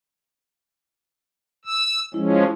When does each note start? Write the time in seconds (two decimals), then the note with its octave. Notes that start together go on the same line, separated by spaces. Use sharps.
1.65 E6
2.14 F3 G#3 C#4 E4